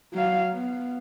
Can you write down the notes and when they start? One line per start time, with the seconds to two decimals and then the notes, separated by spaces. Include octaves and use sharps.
0.13 F#3 F5
0.53 B3